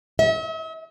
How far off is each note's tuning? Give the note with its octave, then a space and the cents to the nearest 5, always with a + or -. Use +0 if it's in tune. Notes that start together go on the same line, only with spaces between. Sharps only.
E5 -45